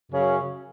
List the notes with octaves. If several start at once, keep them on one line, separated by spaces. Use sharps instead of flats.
F#2 C#3 F#3 C#4